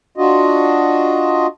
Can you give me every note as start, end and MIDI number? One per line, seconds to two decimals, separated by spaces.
0.18 1.47 62
0.18 1.47 65
0.18 1.47 66
0.18 1.47 75